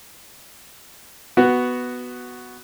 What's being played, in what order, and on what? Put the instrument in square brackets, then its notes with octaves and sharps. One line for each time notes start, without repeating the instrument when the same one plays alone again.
[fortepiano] B3 F#4